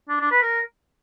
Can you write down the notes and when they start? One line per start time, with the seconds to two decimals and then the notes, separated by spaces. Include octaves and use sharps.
0.09 D4
0.20 D4
0.31 B4
0.42 A#4